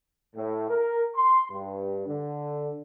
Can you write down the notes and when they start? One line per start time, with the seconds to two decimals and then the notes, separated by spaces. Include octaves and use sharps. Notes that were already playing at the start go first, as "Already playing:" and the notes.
0.35 A2
0.70 A#4
1.15 C6
1.50 G2
2.07 D3